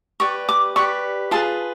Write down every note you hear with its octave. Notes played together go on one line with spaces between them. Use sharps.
G4 B4 D5 C#6
D6
G4 B4 D5 C#6
F4 G#4 B4 A5